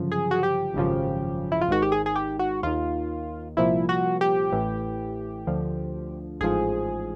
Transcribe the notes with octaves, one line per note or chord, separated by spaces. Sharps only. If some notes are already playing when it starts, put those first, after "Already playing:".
Already playing: G1 F#2 C#3 F3
G#4
F#4
G4
G#1 F#2 C#3 F3
E4
F4
G#1 G#2 D#3 F#4
G4
G#4
G#4
G4
F#4
D#2 D#3 F4
C2 A#2 F3 E4
F#4
G4
A1 A2 E3
D2 D3 F3
A1 G#2 F3 G#4